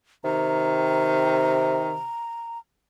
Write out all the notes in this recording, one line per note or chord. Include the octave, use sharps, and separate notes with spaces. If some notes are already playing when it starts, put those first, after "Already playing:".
C3 D#3 A#5